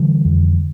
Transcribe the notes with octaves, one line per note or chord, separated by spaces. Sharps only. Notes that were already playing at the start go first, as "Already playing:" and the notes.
Already playing: D3 E3 G3
F2